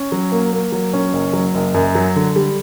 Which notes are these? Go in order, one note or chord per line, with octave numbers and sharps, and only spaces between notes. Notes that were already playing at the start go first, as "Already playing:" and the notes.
Already playing: C#4
F#3
A#3
A#3
F#3
C#4
F#1
F#3
F#1
F#2
F#3
D3
G3